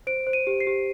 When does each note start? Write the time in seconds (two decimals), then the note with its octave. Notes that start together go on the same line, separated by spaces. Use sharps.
0.07 C5 D7
0.27 C5
0.33 D#7
0.47 G4
0.60 C7
0.67 G4